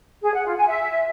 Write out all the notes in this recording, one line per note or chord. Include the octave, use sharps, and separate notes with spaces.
G#4
F#5
F4
G#5
E5